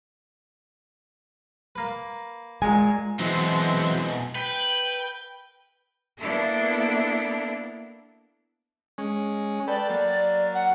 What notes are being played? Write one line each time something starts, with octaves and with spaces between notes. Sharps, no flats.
A#3 B4
A#2 G#3 G#5
B2 E3 F#3 G#3 C4
B4 G5
A#3 B3 D4 E4 A4
G#3 C#4
A4 B4 D5 G5
F#3 A#3
F#5